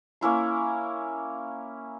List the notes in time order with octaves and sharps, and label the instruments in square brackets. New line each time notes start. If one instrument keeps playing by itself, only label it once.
[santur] A#3 C#4 E4 C6